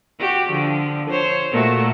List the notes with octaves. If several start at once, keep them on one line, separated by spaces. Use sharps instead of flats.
F#4 G4
D3 F3
C5 C#5
A#2 A3 F#4